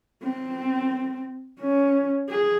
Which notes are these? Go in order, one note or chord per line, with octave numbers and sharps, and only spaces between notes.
C4
C#4
G#4